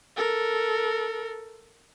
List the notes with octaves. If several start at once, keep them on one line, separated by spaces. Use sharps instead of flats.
A4 A#4